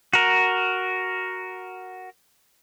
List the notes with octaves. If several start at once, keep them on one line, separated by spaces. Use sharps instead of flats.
F#4 A#4